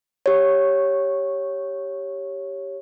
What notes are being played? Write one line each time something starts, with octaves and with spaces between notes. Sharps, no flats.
G4 C#5